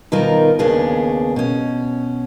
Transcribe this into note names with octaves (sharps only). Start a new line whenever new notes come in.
B2 D#3 G3 D#4 F4 A#4
D#2 C#3 B3 D4 G#4
B2 C#4